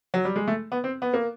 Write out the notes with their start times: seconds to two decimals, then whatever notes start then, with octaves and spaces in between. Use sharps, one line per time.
0.14 F#3
0.25 G3
0.36 G#3
0.48 A3
0.72 B3
0.84 C4
1.02 B3
1.14 A#3